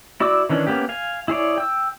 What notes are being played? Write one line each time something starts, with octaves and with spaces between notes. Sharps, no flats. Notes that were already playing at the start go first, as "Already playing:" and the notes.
E4 F#4 D5 D6 E6
D#3 E3 C#4 D4
A#3 B3 C#4 G4
F5 G#5
E4 G#4 C#5 D5
G5 E6